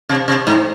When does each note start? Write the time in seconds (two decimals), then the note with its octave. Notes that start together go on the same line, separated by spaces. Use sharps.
0.09 C3
0.28 C3
0.47 G#2